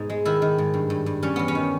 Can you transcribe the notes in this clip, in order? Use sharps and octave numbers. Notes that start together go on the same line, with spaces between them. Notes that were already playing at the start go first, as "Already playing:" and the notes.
Already playing: G#2 B2 D#4
G#3
D#3 E4
D#3
G#2
G2
G2
G2
G3 C#4
E2 B3
C#4
D#3